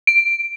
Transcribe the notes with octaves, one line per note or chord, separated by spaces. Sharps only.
D7